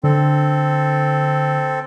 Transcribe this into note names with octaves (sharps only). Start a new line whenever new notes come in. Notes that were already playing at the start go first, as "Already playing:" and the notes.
D3 C4 A4